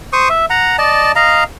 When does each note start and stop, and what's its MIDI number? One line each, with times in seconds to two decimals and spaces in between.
0.13 0.29 72
0.13 0.29 85
0.13 0.29 87
0.30 0.45 76
0.50 0.76 78
0.50 0.76 82
0.78 1.12 74
0.78 1.12 75
0.78 1.12 81
1.16 1.44 75
1.16 1.44 77
1.16 1.44 82